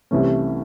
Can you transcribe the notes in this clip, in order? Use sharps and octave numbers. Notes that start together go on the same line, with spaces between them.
C2 C3 E3 A3 C#4